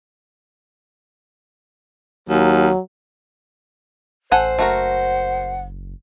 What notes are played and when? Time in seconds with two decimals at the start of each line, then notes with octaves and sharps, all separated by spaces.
2.29 D#2 F#3
4.32 A1 A4 C5 F#5 G#5
4.59 F#1 A3 F#4 A#4 F#5